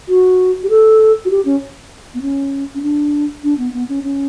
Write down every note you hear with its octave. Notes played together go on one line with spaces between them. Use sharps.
F#4
G4
A4
F#4
G4
C#4
B3
C#4
C#4
D4
D4
B3
B3
C#4
C#4